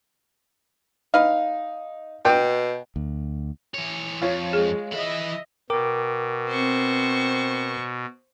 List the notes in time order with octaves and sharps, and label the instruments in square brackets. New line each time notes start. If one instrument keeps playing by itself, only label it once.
[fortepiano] D#4 [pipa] B4 F5
[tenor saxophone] B2 [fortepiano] G5
[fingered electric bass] D2
[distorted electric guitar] E3 C#5
[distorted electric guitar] F2 [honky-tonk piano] F4 C#5
[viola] G#3 [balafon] G#4
[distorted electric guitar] E3 B5 [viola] D#5 E5
[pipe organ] B2 [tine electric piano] A#4 G5 D6
[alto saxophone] C4 [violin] C5 C#6